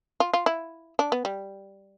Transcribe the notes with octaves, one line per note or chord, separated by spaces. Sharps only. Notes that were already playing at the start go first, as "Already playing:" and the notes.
F4
F4
E4
D4
B3
G3